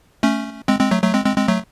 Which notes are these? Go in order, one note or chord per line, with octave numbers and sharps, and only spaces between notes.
A3 C#4
G#3 C4
G#3 C4
F#3 A3
F#3 A3
G#3 C4
G#3 C4
G#3 C4
F#3 A3